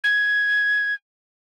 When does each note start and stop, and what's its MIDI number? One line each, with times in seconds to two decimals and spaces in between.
0.04 0.94 92